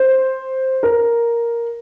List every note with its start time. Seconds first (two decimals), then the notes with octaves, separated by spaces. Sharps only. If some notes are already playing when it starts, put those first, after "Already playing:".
Already playing: C5
0.83 A#4